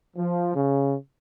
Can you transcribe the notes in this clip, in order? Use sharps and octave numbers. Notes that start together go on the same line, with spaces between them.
F3
C#3